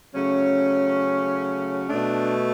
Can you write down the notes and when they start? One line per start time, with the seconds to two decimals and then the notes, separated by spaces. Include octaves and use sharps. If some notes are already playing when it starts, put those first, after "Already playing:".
0.15 C#3 F#3 A3 C#4
1.88 A3 D4
1.94 B2